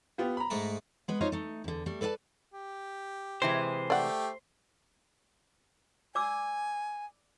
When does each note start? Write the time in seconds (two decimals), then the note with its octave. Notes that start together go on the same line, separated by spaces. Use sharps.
0.18 B3 F4 G4
0.37 A#5 B5
0.50 G#2 G#3 A3
1.08 G#3 B3 B4
1.21 D#4 F4 C5 C#5 D#5
1.32 A3 D#4
1.64 E2 D3
1.86 G3 A3
2.01 A4 B4 D5 F5 A5
2.54 G4
3.42 C3 E3 G#3 C5
3.90 A3 G4 D5 F#5 G5
6.15 D5 G#5 D6 E6